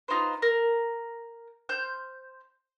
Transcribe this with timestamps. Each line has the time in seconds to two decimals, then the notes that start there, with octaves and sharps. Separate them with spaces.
0.08 D#4 F4 B4 C5
0.42 A#4
1.69 C5 F6 G6